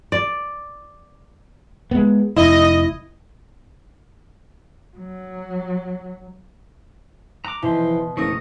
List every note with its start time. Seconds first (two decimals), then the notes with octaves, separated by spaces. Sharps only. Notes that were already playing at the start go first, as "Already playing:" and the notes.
0.12 D5
1.91 G#3 B3
2.36 F1 E4 D#5
4.98 F#3
7.45 A#5 D6 F#6
7.62 B2 E3 F3 G5 C6
8.17 F#1 F3 A3 C#4 C#6 D#6 A#6